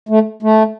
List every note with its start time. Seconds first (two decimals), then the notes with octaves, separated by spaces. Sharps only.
0.09 A3
0.43 A3